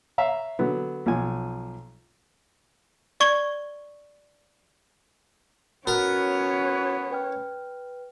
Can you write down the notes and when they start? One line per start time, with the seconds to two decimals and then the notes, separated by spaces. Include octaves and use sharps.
0.18 C#5 E5 F5 A#5
0.59 D3 F#3 B3
1.06 B1 F3 G#5
3.20 D5 C#6 G#6 G7
5.87 B3 C#4 F#4 A#4 C#5
7.11 B4 G5 F6